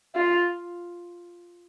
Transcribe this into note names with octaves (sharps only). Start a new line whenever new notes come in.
F4